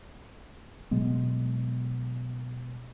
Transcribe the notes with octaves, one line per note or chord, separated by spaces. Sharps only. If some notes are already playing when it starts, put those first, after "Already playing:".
B2 F#3 G#3 B3